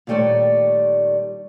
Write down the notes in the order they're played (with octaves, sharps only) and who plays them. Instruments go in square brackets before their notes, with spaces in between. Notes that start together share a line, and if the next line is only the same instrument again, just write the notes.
[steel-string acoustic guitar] A#2 D#3 G3 A3 C#5 D5